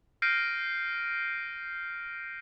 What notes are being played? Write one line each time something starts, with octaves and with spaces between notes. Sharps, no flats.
F6 G6 A#6 C7 D7 D#7